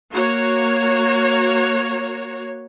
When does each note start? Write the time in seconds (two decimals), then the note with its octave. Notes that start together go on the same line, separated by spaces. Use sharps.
0.12 A#3 F#4 C#5